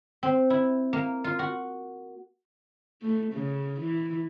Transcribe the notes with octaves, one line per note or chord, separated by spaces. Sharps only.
C4
E4
A#3
F4
F#4
A3
C#3
E3